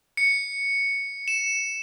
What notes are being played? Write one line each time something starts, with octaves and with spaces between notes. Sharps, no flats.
C#7
E7